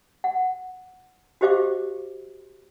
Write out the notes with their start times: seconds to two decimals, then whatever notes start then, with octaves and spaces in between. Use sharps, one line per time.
0.24 F#5
1.41 F#4 G4 C5 D#5 F5 D6